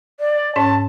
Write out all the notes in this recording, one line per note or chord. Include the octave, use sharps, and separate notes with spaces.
D5
G#2 C#4 C#5 A5